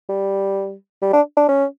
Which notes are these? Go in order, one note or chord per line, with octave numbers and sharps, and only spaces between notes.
G3
G3
D4
D4
C#4